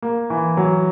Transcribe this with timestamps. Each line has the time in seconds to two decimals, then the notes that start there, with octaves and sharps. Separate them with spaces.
0.02 A#3
0.30 E3
0.57 F#3